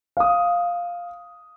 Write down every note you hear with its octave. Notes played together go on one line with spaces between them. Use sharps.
F5 D#6